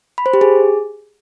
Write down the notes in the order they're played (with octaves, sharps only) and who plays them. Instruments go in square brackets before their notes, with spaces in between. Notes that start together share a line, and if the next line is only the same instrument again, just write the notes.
[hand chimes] B5
C5
G4
G#4